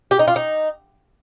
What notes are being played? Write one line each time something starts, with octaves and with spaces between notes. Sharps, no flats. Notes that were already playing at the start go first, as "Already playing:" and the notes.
G4
D#4
F4
D#4